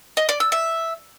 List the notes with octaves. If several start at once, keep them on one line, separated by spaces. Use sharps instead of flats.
D#5
D5
E6
E5